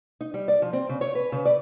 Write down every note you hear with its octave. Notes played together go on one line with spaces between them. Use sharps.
D#4
G3
D5
F3
C4
C#3
C#5
B4
C#3
D5